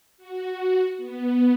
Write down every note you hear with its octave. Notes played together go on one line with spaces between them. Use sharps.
F#4
B3